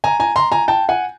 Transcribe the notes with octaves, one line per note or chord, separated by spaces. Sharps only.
G#5 A#5
G#5 A#5
A#5 C6
G#5 A#5
G5 A5
F#5 G#5